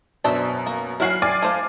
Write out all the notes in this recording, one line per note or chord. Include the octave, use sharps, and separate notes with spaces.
F#2 B2 D4 C5 E5
A#3
F#3 E4 F#4 G#5 F6 C7
D5 G#5 D6 A6
A3 C5 F5